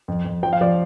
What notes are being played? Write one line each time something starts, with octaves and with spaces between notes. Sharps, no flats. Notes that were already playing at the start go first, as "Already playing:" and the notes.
F2
F2
F3 G5
F5
F3 D5